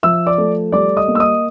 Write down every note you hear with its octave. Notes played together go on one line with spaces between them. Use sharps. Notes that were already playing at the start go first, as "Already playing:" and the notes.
F3 E5 E6
D5 D6
A3
G3 D5 D6
D#5 D#6
A#3
E6
D#5 D#6